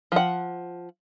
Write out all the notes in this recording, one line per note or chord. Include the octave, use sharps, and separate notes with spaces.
F3 F#5